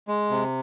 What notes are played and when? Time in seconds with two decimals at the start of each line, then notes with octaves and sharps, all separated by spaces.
0.08 G#3
0.30 C3